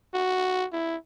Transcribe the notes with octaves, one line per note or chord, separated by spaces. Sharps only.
F#4
E4